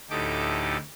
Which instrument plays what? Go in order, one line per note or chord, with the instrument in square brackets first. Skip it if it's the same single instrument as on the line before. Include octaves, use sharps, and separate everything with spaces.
[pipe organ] D2 A2 D#4 G4 A4 D6